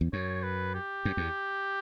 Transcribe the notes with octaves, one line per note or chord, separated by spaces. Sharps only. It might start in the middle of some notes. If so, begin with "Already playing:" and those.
E2
F#2 C#5
B4
G4
F#2
E2